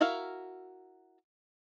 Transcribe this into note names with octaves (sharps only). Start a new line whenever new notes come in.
E4 F#4 A#4 E5 F5